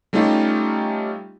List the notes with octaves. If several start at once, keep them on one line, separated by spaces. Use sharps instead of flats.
G3 A3 C#4 D#4 F4 G4